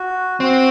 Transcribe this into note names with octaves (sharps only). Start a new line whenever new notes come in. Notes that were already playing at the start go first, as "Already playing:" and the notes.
Already playing: F#4
C4 F#4